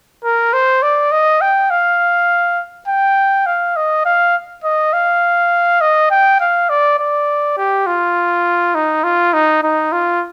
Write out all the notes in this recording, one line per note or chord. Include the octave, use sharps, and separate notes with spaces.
A#4
C5
D5
D#5
G5
F5
G5
F5
D#5
F5
D#5
F5
D#5
G5
F5
D5
D5
G4
F4
D#4
F4
D#4
D#4
F4